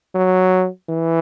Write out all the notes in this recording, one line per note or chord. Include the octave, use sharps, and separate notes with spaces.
F#3
E3